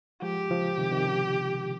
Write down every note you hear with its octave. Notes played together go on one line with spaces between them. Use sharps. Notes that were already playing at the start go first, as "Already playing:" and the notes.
F3 G#3 G4
C#3 F3
C3 D#3
C3 D#3
C#3 F3